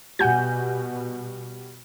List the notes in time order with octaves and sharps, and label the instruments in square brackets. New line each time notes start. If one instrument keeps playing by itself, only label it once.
[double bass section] B2 [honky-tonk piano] G3 F#4 [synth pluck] F#5 G#5 G6